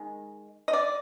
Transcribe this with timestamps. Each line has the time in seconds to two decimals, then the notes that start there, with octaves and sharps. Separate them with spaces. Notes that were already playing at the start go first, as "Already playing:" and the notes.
Already playing: D#3 G#3
0.68 D#5
0.73 D5